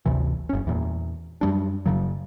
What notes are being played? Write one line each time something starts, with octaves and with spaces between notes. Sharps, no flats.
G#1 D2 C3 E3
F#1 C#4
E2 A#2
F#2 G3 D4
F#1 B1 C#3 F#3